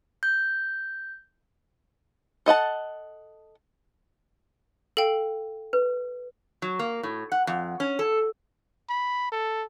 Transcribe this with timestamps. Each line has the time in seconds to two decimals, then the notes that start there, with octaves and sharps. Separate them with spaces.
0.23 G6
2.46 A4 D#5 F#5 A5
4.97 A4 F5 G5
5.73 B4
6.62 F#3
6.79 A#3
7.03 A2
7.32 F#5
7.47 F2
7.80 C#4
7.99 A4
8.89 B5
9.32 A4